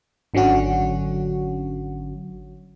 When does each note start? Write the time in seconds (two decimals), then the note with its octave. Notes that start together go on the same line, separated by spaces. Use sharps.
0.34 G#1 D3 F#3 C#4 F#4